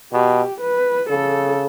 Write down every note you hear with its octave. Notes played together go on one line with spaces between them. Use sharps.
B2 G4
B4
C#3 A4